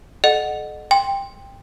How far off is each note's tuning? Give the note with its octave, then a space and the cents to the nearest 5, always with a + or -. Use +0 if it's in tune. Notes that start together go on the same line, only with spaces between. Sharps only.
A4 -35 D#5 -35 F#5 +0
G5 +15 C6 +0